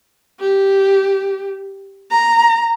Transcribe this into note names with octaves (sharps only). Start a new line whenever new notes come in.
G4
A#5